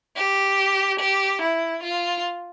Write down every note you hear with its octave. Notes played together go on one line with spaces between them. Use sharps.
G4
G4
E4
F4